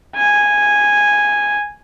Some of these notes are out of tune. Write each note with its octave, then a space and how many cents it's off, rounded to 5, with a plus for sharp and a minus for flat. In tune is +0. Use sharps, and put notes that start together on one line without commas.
G#5 -5